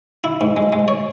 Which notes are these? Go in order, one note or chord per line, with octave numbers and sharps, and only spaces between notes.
E4
G#2
G#3
G#3
C#5